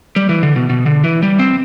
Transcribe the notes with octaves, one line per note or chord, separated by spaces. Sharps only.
G3
E3
D3
B2
B2
D3
E3
G3
C4